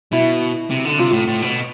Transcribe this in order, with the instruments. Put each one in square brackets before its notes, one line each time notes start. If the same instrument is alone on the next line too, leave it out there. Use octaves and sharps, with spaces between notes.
[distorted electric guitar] B2 [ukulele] E4
[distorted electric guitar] C3
D3
[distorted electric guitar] C3 [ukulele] F4
[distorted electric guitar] A2
A2
B2